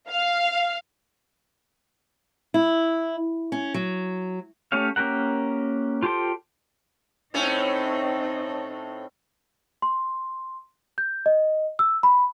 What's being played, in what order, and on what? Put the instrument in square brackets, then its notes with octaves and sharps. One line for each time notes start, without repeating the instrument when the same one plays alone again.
[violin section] F5
[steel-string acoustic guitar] E4
C#4
F#3
[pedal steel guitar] A3 C#4 G4 C#5 F5
A#3 C#4 G4 A#4 F#5
F4 G4 A4 C5 G5
[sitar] A2 A3 C#4 [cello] C4 D#4
[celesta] C6
G6
D#5
E6
B5